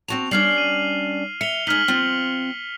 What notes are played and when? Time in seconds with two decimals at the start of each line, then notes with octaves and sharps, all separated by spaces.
0.08 C4 F#4 A5 F7
0.31 G3 C#4 D4 F6 C7 F#7
0.57 C7 D#7
1.41 E5 C#7 F7 G7
1.67 G#3 D#4 F6 B6 F#7
1.88 F3 C4 F4